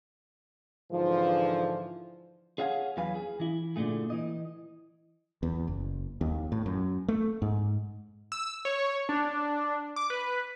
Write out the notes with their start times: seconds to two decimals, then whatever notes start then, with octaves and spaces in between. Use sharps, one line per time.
0.91 G#2 D3 E3 F3
2.58 G#4 C#5 F5 F#5 G#5
2.97 E2 F#3 B4 F5 G#5
3.15 G#4
3.40 E3 E4
3.76 A#2 D3 E3 A3 G#4
4.10 E3 D#5
5.43 E2
5.68 F#1
6.21 D#2
6.52 A2
6.66 F#2
7.08 A3
7.42 G#2
8.32 E6
8.65 C#5
9.09 D4
9.96 D6
10.10 B4